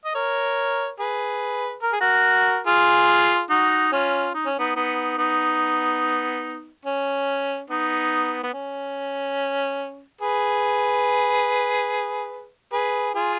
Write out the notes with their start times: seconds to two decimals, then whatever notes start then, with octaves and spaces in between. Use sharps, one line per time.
0.05 D#5
0.15 A#4 C#5
1.00 G#4 B4
1.83 A#4
1.93 G#4
2.01 F#4 A#4
2.67 F4 G#4
3.50 D#4 F#4
3.92 C#4 F4
4.34 D#4
4.46 C#4
4.59 B3 D#4
4.76 B3 D#4
5.18 B3 D#4
6.85 C#4
7.70 B3 D#4
8.43 B3
8.54 C#4
10.21 G#4 B4
12.72 G#4 B4
13.15 F4 G#4